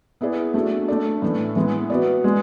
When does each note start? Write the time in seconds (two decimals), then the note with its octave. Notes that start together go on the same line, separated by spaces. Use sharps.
0.21 B3 E4 G#4 D5
0.54 A3 D4 F#4
0.88 A3 D4 A4 D5
1.22 A2 E3 A3
1.56 E3 G#3 B3
1.90 B3 F#4 B4 D5
2.24 G#3 B3